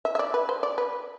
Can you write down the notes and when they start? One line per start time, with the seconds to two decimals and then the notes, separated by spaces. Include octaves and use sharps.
0.05 E5
0.15 E5
0.19 D5
0.34 B4
0.49 C5
0.63 D5
0.78 B4